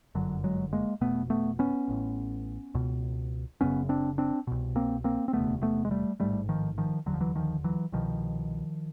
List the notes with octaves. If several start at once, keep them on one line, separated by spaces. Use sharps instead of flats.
G1 F#2 D3 F#3
F#3 G#3
G#3 A#3
F1 E2 B2 A3 B3
A3 B3
B3 C#4
A1 A2
C#2 B2
F#1 F#2 C#3 B3 C#4
C4 D4
C4 D4
C2 B2
A#3 C4
A#3 C4
C4
E1 D2 C3 A3 B3
A3 B3
G#3
G3 A3
A1 G#2 G3 A3
D#3 F3
D#3 F3
F1 D#2 D3 F#3
F3
E3 F#3
D#3 F3
E3 F#3
C2 B2 D#3 F3